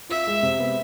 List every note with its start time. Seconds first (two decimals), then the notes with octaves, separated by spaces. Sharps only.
0.09 F4 E5
0.27 G#3
0.43 C3
0.59 B3